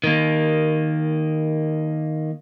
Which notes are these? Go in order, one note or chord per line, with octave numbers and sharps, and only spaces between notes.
D#3 A#3